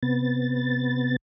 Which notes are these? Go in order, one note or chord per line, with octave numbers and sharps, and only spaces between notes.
C3 B3 A6